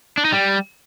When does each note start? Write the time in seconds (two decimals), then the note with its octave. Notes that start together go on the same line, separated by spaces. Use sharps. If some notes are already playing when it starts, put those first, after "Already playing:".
0.18 D4
0.25 D#4
0.32 G3